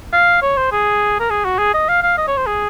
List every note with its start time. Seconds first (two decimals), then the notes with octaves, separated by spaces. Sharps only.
0.13 F5
0.42 C#5
0.57 C5
0.72 G#4
1.20 A#4
1.30 G#4
1.45 F#4
1.58 G#4
1.74 D#5
1.88 F5
2.03 F5
2.18 D#5
2.28 C#5
2.37 C5
2.47 G#4